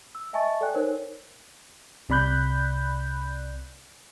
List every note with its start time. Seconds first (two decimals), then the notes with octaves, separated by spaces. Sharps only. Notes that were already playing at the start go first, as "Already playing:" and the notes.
0.15 E6
0.33 D#5 E5 G#5 A5 C#6 A6
0.61 A4 D5 G5 G#5 F#6
0.74 D#4 A#4 C5 C#5
2.09 C2 C3 D5 B5 F#6 G6